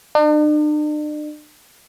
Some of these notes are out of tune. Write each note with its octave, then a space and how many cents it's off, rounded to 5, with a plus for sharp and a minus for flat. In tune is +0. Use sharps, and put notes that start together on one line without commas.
D4 +45